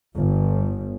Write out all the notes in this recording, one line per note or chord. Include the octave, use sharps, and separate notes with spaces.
G1